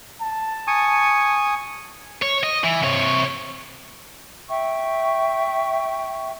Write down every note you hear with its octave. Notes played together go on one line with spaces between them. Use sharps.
A5
G#5 C#6 D#6
C#5
D#5
E3
C3 C#5
E5 G5 C#6